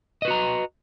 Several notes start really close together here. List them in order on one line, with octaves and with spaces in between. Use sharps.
D#5 B4 F#4 A#5